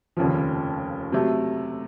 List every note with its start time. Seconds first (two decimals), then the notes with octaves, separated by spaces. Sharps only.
0.17 F1 D#2 C#3 F3
1.12 C3 F#3 A3